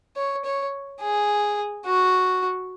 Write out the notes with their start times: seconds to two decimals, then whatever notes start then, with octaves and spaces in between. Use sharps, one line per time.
0.16 C#5
0.45 C#5
1.00 G#4
1.85 F#4